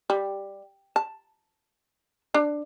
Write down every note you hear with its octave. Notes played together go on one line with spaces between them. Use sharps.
G3
A5
D4